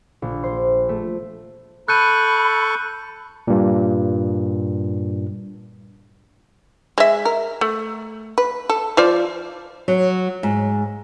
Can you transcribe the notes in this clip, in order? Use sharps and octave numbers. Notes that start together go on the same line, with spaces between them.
A#1
C5
A3
A4 B5 C#6 F#6 G6 D#7
G2 A#2
G#3 E5
A#4
A3
B4
A4
F3 F4 D5
F#3
G#2